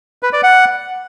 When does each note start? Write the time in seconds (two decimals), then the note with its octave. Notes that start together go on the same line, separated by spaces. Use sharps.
0.23 B4
0.33 D5
0.43 F#5